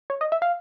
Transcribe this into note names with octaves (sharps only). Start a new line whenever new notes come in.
C#5
D#5
E5
F5